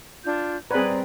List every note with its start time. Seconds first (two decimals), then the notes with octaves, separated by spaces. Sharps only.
0.24 D4 F4 G6
0.71 G3 C4 G#4 B4 D5 G5 A#5